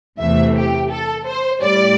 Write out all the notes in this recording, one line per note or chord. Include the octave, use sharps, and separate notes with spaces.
E2 C3 E3 A3 E5
G4
A4
C5
A2 G3 D5